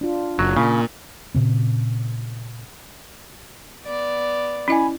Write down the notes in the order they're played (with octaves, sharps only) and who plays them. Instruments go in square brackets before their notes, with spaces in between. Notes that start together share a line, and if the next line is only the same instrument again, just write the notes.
[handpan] D4 F4
[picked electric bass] F#1 [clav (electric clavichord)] F#3
[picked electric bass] A#2 [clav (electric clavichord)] C#3
[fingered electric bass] A#2 C#3 C4
[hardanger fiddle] B3 D5
[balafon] C#4 E4 D#5 [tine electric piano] G#5 B5